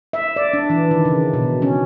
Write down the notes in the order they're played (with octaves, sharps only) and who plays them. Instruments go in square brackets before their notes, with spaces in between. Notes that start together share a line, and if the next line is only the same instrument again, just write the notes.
[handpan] E5
D5
D4
E3
D#3
C#3
B2
C#4